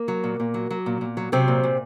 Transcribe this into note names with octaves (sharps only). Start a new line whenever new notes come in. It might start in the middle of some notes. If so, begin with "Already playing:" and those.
Already playing: A#3
F#3
A#2
A#2
F#3
F#3
A#2
A#2
F#3
C3 F#3 C4
A#2
A#2